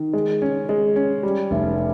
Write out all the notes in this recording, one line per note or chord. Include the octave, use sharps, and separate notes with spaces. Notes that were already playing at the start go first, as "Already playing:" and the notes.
Already playing: D#3
G#3
C#4
G#3
C#4
G3
F1